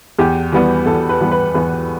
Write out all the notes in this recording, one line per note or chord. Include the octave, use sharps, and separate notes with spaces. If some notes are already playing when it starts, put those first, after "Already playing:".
E2 G4
E3 G3 B3
E2 A4
B4
E3 G3 B3
B4
E2 B4